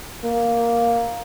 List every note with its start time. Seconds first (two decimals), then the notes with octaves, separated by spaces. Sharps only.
0.24 A#3